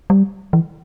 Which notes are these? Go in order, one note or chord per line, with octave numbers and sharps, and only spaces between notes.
G3
E3